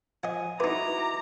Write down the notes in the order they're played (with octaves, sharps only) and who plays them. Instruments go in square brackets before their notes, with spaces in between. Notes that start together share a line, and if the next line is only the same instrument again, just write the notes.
[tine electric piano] F3 G#5 [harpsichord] D#5 F#5
[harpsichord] D#4 B4 [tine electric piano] E4 F#4 [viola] A#5 [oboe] D6